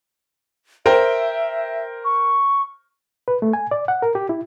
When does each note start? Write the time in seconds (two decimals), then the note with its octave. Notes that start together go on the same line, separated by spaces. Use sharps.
0.86 A#4 C5 E5 G5
2.05 C#6
3.28 B4
3.42 A3
3.53 G#5
3.71 D5
3.88 F#5
4.02 A#4
4.15 G4
4.29 E4